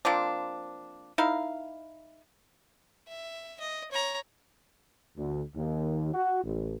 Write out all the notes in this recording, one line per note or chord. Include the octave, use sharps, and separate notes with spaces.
F3 A#3 C4 D4
D#4 E4 A#4 F5
E5
D#5
C#5 A#5
D2
D#2
F#4
A1